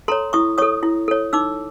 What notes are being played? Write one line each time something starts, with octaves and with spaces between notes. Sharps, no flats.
A4 C#5 A#5 C6
E4 C#6 D#6
A4 C#5 C#6 D#6
E4
A4 C#5
D#4 D6 E6